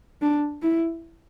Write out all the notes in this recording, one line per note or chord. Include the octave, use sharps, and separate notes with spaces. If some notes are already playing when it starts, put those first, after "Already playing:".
D4
E4